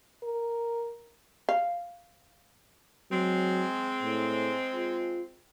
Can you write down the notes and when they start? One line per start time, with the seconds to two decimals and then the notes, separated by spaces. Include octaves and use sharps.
0.24 A#4
1.49 F5
3.12 F#3 G#3 C4
4.03 A2
4.75 F4